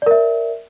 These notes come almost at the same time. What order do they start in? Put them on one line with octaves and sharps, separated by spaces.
D5 A#4 E5